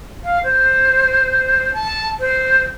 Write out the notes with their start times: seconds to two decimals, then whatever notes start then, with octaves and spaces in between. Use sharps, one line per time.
0.24 F5
0.44 C5
1.74 A5
2.20 C5